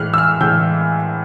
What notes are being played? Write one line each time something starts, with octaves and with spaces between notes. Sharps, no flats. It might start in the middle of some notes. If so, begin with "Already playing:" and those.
Already playing: A2 E3 G#3 F6 F#6
E6
F6
A2 E3 G#3 G6